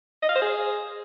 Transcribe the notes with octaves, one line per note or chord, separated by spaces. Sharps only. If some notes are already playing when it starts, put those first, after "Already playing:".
D#5
F5
C5
G#4